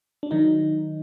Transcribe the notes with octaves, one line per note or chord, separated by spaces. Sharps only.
D4
D#3 F#3 D#4